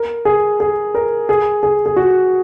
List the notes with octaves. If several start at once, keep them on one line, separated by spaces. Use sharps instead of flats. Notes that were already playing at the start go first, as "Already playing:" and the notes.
Already playing: A#4
G#4
G#4
A#4
G#4
G#4
G#4
F#4